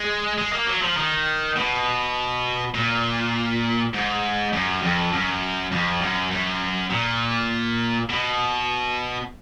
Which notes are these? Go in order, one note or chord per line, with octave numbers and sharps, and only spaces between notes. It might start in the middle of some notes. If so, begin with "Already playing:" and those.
Already playing: G#3
G#3
A#3
F#3
F3
D#3
B2
A#2
G#2
F#2
F2
F#2
F2
F#2
F#2
A#2
B2